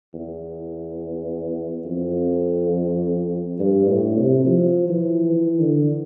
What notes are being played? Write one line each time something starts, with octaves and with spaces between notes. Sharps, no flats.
E2
F2
G2
A2
C3
F3
E3
E3
D3